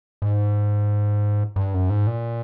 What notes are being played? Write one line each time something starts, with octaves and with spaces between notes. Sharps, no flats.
G#2
G2
F#2
G#2
A#2